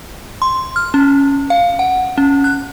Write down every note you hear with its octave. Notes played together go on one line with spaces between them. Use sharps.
C6
F6
C#4
F5
F#5
C#4
F#6